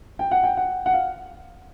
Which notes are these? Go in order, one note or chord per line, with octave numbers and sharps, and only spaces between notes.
G5
F#5
G5
F#5
F#5
F5